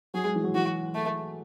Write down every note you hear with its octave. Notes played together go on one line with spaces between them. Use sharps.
F#3 G#4
G#3
E3
F#3
E3 F#4
A3